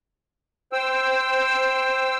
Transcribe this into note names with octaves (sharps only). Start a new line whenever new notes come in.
C5 G5 E6